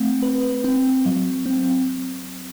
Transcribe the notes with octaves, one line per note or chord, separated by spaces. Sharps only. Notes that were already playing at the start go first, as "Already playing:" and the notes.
Already playing: A3 C4
B4
C4
F#3
C4